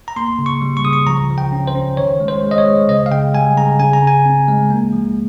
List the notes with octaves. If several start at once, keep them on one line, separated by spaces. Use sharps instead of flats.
A#5
A#3 C6
C#3
C#6
G3
C#6
C#3 D#6
C#6
F3 A#5
F3
G5
C#4
C5
C#4
D#3 C#5
G#3
C5
G#3
D#5
C#5
G#3
C#3 D#5
F5
C#3 G5
G3 G#5
C#3 A#5
C#3 G#5
A#5
C#3
G#5
C4
G#3
A#3
F3